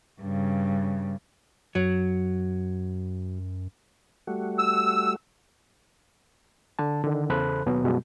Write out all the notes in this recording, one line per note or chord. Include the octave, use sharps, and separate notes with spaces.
G2 C#3
F#2 F#3
G3 A3 F#4
E6
D3 A5
D3 D#3
E2 C#3 A4 C5 B5 F#6
D#2 B2 F#3 B3
F#2 B2 G3 G#3